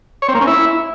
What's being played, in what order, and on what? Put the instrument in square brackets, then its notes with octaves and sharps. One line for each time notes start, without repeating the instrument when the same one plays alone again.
[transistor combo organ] C#5
C4
A#3
C#4
E4